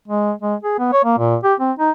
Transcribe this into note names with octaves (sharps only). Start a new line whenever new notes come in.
G#3
G#3
G#4
B3
C#5
A#3
A#2
G4
C4
D#4